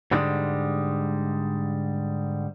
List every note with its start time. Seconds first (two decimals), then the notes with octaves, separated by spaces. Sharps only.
0.11 G#2 D3 G3 G#3